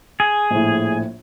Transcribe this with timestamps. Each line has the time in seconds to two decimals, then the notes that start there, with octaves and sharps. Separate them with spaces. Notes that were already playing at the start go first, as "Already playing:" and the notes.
0.20 G#4
0.51 A#1 A2